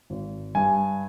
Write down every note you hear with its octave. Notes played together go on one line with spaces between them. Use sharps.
G#1
G2 G#5